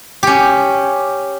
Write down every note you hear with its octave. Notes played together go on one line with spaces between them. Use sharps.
C#4 G4